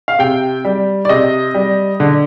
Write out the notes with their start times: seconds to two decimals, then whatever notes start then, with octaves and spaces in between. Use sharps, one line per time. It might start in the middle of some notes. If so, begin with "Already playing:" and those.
0.08 F5
0.19 C3 G5
0.65 G3
1.05 D5
1.09 C3 D#5
1.54 G3
2.00 D3